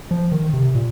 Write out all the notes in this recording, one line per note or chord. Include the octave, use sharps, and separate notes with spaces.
F3
D#3
C3
A#2